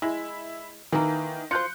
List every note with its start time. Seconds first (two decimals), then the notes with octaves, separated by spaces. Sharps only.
0.02 G#3 E4
0.92 D#3 E3 A#3
1.51 F4 C5 F#6 G6 C#7